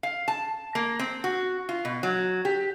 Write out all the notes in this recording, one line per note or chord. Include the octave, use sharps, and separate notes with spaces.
F5
A5
A#3
C4
F#4
F4
B2
F#3
G4